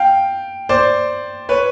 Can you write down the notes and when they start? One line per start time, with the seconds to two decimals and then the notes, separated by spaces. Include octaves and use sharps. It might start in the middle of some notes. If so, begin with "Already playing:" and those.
Already playing: F5 G5
0.69 C5 D5
1.49 B4 C#5